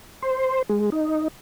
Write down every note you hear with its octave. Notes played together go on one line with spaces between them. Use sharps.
C5
G#3
D#4